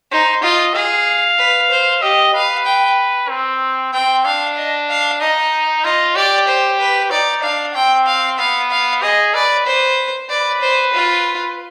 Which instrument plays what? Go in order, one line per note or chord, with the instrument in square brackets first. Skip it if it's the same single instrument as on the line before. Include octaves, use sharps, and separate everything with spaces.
[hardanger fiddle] D#4 [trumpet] C5
[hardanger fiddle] F4 [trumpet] D#5
[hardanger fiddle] G#4 [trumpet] F5
[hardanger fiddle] B4
C5
[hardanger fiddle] G4 [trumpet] D#5
[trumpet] B4 [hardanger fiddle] F5
[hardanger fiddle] G5
[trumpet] C4
[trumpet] C4 [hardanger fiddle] G5
[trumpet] D4 [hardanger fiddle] F5
[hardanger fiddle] D#5
F5
[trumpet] D#4 [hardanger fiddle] D#5
[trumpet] F4 [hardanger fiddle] D#5
[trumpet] G4 [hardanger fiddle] D5
[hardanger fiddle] C5
B4
[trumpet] D#4 [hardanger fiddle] D5
[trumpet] D4 [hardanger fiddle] F5
[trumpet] C4 [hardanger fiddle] G5
[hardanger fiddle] F5
[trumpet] B3 [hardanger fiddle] F5
[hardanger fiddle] F5
[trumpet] G#4 [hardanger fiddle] D#5
[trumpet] B4 [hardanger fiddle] D5
[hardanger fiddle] C5
[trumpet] B4 [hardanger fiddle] D5
[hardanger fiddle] C5
F4